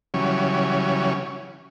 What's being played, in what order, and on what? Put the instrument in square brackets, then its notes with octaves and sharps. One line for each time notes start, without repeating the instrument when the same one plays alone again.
[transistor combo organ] C#3 E3 F#3 G3 C#4